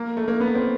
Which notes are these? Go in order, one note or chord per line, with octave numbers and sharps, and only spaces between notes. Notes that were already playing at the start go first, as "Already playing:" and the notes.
Already playing: A#3
A3
A#3
B3
C4